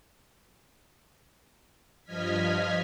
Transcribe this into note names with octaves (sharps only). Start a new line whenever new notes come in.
G2 F3 D#5 F6 G#6 B6